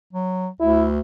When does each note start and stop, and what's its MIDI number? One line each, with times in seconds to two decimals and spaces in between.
0.13 0.48 54
0.61 1.00 38
0.61 0.86 64